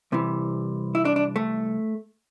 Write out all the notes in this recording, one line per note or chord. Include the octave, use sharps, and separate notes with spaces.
C2 C3 E3
E4
D4
D4
A3